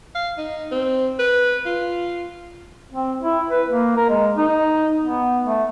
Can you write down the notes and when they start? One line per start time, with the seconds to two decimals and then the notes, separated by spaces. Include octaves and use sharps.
0.15 F5
0.38 D#4
0.71 C4
1.19 B4
1.66 F4
2.93 C4
3.22 E4
3.51 B4
3.69 A#3
3.97 A#4
4.10 G#3
4.37 D#4
5.02 B3
5.44 A3